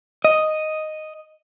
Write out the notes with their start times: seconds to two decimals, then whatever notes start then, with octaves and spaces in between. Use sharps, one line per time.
0.25 D#5